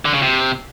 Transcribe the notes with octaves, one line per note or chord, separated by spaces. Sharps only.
D3
C#3
C3